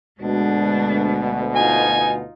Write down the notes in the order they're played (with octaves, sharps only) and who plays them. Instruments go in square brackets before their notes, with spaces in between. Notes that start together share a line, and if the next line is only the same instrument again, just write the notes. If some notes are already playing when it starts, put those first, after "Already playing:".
[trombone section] D2 B2 [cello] G#3 D4
[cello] D#4 F4 [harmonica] G#5